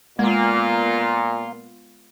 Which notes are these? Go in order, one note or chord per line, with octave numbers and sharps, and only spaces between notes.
A#2 G#3 A#3 B3 F4